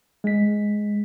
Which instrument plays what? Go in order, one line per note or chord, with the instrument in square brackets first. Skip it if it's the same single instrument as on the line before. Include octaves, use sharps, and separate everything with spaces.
[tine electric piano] G#3 B6